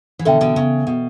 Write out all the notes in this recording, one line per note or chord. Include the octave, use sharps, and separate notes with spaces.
E3
B2 D3 A4 E5 G5
B2 D3
C#3
B2